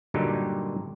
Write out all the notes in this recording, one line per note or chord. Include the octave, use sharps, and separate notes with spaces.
G2 A#2 D3 F#3 D#4 G4